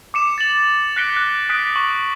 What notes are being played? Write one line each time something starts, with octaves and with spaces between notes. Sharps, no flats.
D6 C#7 E7
A6 F#7
F#6 A#6 B6 C#7 D7 G7
F#6
D#6 F#6 B6 D7
C#6 F#7